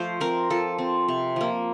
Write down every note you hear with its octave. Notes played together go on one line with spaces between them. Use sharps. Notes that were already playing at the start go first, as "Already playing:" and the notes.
Already playing: F3 A3 C5 F5
C4 A#4
F3 A4
C4
C3
F3 A#3